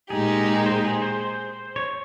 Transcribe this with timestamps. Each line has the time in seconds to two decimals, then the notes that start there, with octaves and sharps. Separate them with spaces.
0.10 A#2 G#3 D#4 G4 G#4
0.66 C5
0.84 G#4
1.02 C5
1.20 C5
1.76 C#5